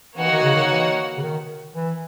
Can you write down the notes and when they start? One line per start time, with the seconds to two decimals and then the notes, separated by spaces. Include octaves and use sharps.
0.18 E3 A#3 D#4 F#4 C#5 F#5
0.31 D#3
0.43 C#3
0.56 D#3
0.70 E3
1.17 C#3
1.22 D#3
1.75 E3